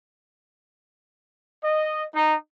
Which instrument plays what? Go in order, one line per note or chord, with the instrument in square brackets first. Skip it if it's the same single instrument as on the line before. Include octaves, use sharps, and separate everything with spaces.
[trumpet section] D#5
D#4